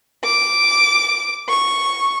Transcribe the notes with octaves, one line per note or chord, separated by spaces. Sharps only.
D6
C#6